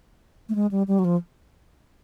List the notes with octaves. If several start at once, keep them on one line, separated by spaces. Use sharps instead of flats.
A3
G#3
G3
G3
F#3
F3